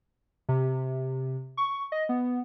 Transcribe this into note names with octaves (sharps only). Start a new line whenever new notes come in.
C3
C#6
D#5
B3